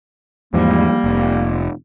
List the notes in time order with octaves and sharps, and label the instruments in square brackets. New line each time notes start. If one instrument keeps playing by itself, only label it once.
[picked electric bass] E2 G#2 F3 [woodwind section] G3 A#3
[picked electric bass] F1